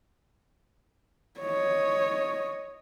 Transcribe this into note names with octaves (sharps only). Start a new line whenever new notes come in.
C#5 D#5